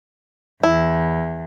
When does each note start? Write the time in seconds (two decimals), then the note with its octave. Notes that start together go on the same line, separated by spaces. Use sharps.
0.63 E2 E4